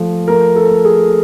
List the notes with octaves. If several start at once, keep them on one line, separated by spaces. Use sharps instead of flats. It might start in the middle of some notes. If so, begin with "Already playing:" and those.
Already playing: F3 A3
A3 A#4
A4
A3
G#4